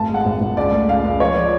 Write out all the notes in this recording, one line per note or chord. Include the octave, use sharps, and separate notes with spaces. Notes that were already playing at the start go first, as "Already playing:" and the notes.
Already playing: G#1 A3 A5
G#3
F#5
G#1
G#1
C#2 D5
A3
C#2 F5
C#2
F3 C#5
F3 D5